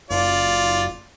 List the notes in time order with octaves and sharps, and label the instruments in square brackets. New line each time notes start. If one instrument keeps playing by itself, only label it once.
[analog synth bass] F#1 [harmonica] F4 D5